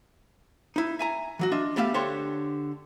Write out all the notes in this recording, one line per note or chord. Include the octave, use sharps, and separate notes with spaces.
D#4 E4
E5 G#5 A#5
E3 F#3 F#4
D4 F4 D#5 E5
A3 B3 G4 E5 F5
D3 D4 G4 C5 C#5 C6